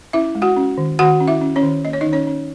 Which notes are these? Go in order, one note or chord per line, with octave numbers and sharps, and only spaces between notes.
C#4 E4 E5
G#3
F#4 F#5
C#4
D#3
D#3 F#4 F#5
C#4
E4 E5
C#4
C#4 C#5
D#3
A#3 D#5
C#5
D#4 D#5
D#3
C#4 C#5
C#4